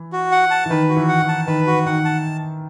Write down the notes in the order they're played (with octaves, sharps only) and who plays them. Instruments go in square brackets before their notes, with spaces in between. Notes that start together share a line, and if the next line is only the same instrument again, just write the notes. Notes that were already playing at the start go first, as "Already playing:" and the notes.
Already playing: [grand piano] E3
[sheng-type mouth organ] F#4
F#5
A5
[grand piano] E3
[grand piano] D#3 [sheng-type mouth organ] B4
[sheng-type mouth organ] F#4
[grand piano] E3
[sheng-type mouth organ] F#5
[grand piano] E3
[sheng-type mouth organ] A5
[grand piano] D#3 [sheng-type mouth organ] B4
[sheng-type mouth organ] F#4
[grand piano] D#3 [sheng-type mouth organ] F#5
[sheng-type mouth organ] A5